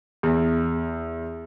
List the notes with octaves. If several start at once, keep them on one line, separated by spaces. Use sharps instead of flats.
E2